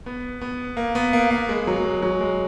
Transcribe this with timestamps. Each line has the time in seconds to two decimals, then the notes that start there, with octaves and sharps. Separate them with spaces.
0.06 B3
0.41 B3
0.77 A#3
0.95 B3
1.13 A#3
1.30 A#3
1.49 G#3
1.67 F#3
1.85 G#3
2.02 F#3
2.21 G#3